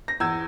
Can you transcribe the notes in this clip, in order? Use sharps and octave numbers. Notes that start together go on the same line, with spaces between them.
A#6
E2 E6 G#6